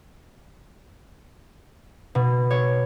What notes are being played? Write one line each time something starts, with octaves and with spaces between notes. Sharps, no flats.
B2
C#5